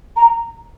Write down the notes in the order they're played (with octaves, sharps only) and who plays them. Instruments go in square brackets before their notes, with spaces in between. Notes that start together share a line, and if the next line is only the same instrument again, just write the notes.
[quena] A#5